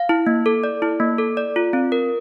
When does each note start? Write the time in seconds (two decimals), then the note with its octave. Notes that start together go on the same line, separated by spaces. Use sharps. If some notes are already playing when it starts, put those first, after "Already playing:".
Already playing: F5
0.09 E4
0.27 A#3
0.46 A4
0.64 D5
0.82 E4
1.00 A#3
1.18 A4
1.37 D5
1.56 F4
1.73 C4
1.92 A#4